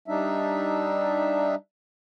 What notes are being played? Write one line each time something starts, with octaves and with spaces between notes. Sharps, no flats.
G3 D4 D#4 E5